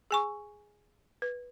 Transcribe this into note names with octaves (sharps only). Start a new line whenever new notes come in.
G#4 G#5 C#6
B4